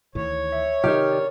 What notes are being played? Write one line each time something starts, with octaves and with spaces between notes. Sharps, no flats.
D2 D#3 E3 C#5
E5
C3 D#3 D#4 G4 A#4 F6
D5